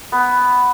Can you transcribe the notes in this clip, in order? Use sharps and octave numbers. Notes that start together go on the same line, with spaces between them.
B3